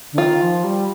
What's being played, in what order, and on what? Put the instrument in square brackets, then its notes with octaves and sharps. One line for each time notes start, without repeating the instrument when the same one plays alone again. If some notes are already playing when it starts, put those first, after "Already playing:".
[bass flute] D3
[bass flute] D#3 [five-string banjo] F4
[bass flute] F3
G3